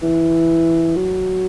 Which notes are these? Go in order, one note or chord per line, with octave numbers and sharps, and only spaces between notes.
E3
F#3